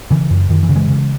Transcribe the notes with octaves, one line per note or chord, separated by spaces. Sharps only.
C#3 E3
F#2
F#2 D#3
E3
C#3
E3 G#3
C#3